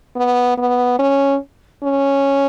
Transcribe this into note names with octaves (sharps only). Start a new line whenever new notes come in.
B3
B3
C#4
C#4